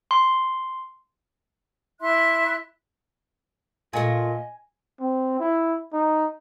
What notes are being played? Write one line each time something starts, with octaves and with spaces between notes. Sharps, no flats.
C6
E4 E5 C6 F#6
A#2 A3 F4 D#5 G#5 A#6 C#7
C4
E4
D#4